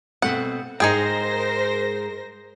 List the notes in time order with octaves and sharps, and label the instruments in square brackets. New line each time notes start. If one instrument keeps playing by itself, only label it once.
[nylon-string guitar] B2 A3 C4 [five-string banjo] F#5
[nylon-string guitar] G#2 G#3 [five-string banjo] D#4 G#4 G5 [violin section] A#4 C5 A#6